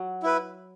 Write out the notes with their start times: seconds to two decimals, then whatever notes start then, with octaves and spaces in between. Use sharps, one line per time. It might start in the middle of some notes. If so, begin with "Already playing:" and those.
Already playing: F#3
0.23 E4 B4